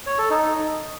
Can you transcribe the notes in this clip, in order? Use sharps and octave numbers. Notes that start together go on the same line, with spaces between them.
C#5
A4
D#4